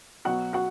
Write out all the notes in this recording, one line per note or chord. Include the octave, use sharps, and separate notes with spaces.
B2 F#3 B3 F#4 F#5
F#4 F#5